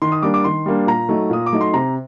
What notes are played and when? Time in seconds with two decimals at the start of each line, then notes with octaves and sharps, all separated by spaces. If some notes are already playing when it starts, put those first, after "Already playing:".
0.02 D#3 C6
0.12 D#6
0.22 G3 A#3 D4 D6
0.34 D6
0.44 D#3 C6
0.66 G3 A#3 D4
0.87 A#2 A#5
1.09 F#3 A3 D#4
1.30 A#2 D#6
1.46 D6
1.52 F#3 A3 D#4
1.61 C6
1.73 C3 A#5